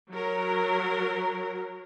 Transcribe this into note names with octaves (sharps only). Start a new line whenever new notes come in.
F#3 A#4